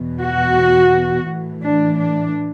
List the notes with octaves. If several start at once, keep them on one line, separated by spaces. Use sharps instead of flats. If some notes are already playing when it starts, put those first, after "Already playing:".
Already playing: E2 B2
F#4
A2 E3
D4
D4